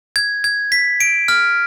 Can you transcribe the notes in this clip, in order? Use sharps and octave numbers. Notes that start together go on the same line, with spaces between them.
G#6
G#6
B6
D7
F6